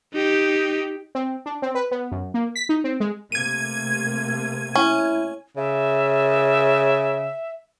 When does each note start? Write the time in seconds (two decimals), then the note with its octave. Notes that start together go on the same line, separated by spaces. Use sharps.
0.13 D#4 G4
1.15 C4
1.46 D4
1.62 C4
1.75 B4
1.91 B3
2.11 F#2
2.34 A#3
2.56 B6
2.69 D#4
2.84 C4
3.00 G#3
3.32 C3 A3 A#3 G#6 D#7
4.75 C#4 E4
5.57 C#3 E5